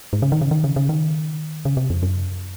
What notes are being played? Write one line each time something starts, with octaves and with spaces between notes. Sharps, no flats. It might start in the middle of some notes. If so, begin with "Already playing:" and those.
G#2
C#3
D#3
C#3
D#3
C#3
C#3
D#3
C#3
C3
F2
F#2